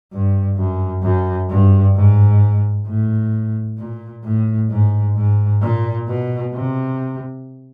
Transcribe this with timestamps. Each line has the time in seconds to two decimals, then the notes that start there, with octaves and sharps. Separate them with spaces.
0.12 G2
0.57 F#2
1.03 F#2
1.50 G2
1.95 G#2
2.87 A2
3.78 A#2
4.24 A2
4.70 G#2
5.16 G#2
5.61 A#2
6.08 B2
6.54 C3